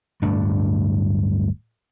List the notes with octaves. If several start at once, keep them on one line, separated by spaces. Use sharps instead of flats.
D1 G2 A3 D4